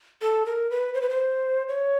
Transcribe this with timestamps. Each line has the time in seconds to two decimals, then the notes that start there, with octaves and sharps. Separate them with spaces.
0.21 A4
0.46 A#4
0.71 B4
0.94 C5
1.01 B4
1.10 C5
1.68 C#5